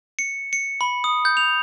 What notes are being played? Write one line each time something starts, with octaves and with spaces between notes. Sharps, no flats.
C#7
C#7
B5
D#6
G6
F7